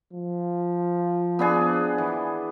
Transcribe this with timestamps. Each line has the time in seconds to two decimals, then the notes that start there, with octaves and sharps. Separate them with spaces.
0.13 F3
1.39 B3 D4 G#4
1.98 E3